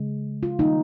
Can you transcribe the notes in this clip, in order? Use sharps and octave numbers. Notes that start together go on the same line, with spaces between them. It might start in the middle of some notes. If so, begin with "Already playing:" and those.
Already playing: C#3 G#3
F4
D#3 G3 A#3 D#4